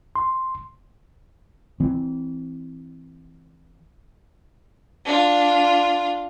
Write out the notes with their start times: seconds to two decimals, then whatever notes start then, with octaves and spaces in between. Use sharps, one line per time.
0.16 C6
1.80 E3 C4
5.05 D4 F4